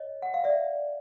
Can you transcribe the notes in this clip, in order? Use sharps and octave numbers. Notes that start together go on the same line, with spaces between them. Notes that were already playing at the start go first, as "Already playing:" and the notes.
Already playing: C#5 D#5
F#5
F5
D5 E5